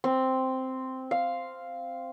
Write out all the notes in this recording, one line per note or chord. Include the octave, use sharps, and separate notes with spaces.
C4
F5